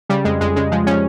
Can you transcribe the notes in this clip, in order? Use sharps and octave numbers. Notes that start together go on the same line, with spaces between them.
C#3 G3
F2 G#3
F2 G#3
C#3 G#3
F3 G#3
F3 C#4